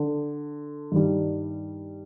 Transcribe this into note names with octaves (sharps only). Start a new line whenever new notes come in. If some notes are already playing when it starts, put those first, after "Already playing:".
Already playing: D3
G2 D#3 G3